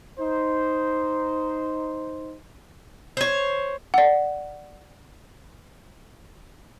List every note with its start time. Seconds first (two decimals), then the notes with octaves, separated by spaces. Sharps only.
0.19 D#4 C5
3.17 C5 C#5
3.94 D5 F#5